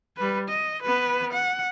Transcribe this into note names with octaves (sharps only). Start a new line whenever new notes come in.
G3 B4
D#5
B3 B4
F#5